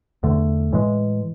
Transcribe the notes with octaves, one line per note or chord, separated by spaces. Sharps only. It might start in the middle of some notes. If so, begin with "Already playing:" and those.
E2 D3 A3
A2 E3 G#3